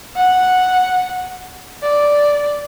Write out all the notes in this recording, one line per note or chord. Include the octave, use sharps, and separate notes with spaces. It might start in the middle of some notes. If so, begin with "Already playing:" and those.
F#5
D5